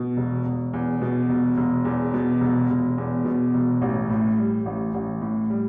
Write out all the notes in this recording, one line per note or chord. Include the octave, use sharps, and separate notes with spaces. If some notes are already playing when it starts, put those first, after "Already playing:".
Already playing: B2
E1
E1
E2
B2
E1
E1
E2
B2
E1
E1
E2
B2
E1
A1
A2
G3
A1
A1
A2
G3